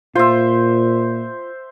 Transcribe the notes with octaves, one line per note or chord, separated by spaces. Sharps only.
A#2 F4 C5 E5